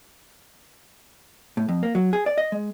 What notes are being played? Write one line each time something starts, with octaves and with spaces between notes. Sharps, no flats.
A2
F2
A#3
F#3
G#4
D5
D#5
G#3